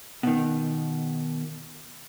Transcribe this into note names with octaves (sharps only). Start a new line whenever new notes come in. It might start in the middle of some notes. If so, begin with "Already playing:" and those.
B2 D#3